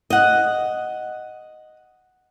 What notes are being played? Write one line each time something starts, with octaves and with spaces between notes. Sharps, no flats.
D#5 F#5